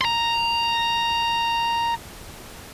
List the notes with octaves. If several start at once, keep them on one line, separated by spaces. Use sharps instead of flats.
A#5 C6